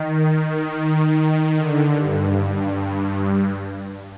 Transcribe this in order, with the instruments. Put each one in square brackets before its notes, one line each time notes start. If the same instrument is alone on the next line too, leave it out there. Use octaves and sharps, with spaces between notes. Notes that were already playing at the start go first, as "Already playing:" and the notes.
Already playing: [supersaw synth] D#3
D#3
D3
G2